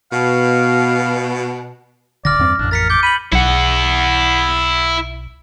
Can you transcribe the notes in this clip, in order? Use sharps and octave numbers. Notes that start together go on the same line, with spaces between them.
B2 F5
D1 D3 D5 F6 A#6
E2 G2 C4
A1 F2 D4
A#4 A6 B6 C#7
D6 G6 G7
B5 D#7 F#7
B1 E4 F#5